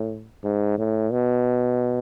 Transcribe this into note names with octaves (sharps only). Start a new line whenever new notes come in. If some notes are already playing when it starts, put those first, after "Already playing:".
Already playing: A2
G#2
A2
B2